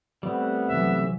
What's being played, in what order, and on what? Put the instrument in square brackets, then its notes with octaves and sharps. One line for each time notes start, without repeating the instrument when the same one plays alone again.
[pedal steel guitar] G3 A3 C4 [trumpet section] B3
[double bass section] C2 E3 F#3 [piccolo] E5